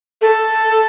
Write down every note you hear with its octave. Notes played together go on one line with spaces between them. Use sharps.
A4